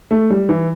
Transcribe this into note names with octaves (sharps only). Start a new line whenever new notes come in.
A3
G3
E3